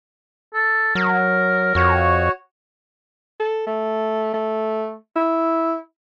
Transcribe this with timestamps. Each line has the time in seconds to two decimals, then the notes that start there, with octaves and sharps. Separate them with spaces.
0.54 A4
0.95 F#3 A#4
1.75 F2 F#4 C#5
3.40 A4
3.67 A3
4.34 A3
5.16 E4